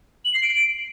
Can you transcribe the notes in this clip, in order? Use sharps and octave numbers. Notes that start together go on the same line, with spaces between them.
F#7
C7
D7